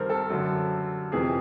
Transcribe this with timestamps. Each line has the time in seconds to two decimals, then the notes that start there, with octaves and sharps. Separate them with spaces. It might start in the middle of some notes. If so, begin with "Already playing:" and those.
Already playing: G2 D#3 A#4 C5
0.09 A4
0.30 F#2 D3
1.12 F2 C3 E3 G#4